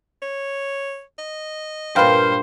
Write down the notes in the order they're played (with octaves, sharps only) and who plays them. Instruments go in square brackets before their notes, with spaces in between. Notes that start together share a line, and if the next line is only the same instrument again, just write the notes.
[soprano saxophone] C#5
D#5
[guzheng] G2 A#2 [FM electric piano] B4 F5 G5 [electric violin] C5